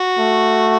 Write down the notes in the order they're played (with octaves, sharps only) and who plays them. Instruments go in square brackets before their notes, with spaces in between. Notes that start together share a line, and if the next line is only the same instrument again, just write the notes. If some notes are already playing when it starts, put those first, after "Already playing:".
Already playing: [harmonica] F#4
[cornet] A3